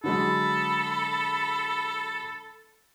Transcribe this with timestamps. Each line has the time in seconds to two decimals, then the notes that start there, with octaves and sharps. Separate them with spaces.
0.04 D3 F#3 G#3 A4 B5